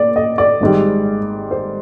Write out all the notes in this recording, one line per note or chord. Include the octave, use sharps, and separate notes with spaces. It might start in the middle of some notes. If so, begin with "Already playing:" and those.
Already playing: A#2 D5
D#5
D5
G#1 G#2 G3
C5